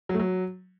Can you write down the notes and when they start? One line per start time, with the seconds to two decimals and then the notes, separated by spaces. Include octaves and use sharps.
0.09 F#3
0.14 A3
0.20 F#3